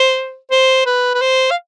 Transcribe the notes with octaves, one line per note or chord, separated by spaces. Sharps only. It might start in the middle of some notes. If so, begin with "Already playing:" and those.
Already playing: C5
C5
B4
B4
C5
F5